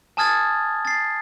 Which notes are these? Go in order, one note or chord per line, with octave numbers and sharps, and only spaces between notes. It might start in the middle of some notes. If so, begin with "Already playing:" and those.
G#5 A5 D#6 F6 G#6 A6
A6 C7